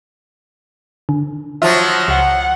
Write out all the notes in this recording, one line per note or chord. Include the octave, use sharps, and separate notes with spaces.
D3
F3 F#3 F4 E5
C#2 F#5